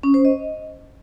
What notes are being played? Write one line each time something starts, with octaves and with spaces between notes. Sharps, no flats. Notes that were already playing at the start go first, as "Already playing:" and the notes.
C#4
C5
D#5